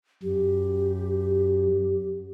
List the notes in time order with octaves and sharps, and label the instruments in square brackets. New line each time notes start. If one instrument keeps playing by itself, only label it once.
[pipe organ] F#2 [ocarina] G4